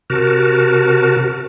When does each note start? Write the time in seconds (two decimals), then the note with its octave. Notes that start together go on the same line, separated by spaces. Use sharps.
0.10 C3 F#4 A#4 A5